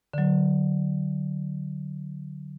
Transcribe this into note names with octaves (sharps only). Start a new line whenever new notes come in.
D3 F#3